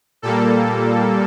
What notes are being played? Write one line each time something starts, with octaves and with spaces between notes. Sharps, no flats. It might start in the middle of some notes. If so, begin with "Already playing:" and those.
A#2 G3 A#3 A4